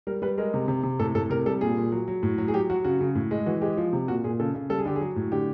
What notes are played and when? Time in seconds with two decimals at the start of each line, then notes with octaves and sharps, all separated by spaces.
0.07 G3 A#4
0.22 G3 B4
0.38 G#3 A#4
0.54 C3
0.68 C3
0.83 C3
0.99 A2 A4
1.15 A2 A4
1.30 C3 A#4
1.46 G3 A4
1.61 A#2 G#4
1.77 A#2
1.92 F#3
2.08 F#3
2.23 A2
2.38 F#3
2.48 G#4
2.54 F#3 G4
2.70 F#3 F#4
2.85 C#3 F#4
3.01 C#3
3.15 A2
3.31 G#3
3.46 E3 F#4
3.61 G#3 G4
3.77 F3
3.93 C3
4.08 A#2 F#4
4.24 A#2 G#4
4.39 C#3 A4
4.55 C#3
4.70 G3 A4
4.79 G#4
4.86 D3 G4
4.96 F#3 G#4
5.16 A2
5.32 D3 G4